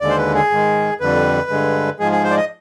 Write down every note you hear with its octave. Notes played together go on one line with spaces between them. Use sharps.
D#2 D3 G#3 D5
C5
B4
G#4
G#2 D#3 G#3
F2 D3 G3 B4
G2 D3 G#3
G#2 F3 G#3 G#4
G#4
C5
D5
D#5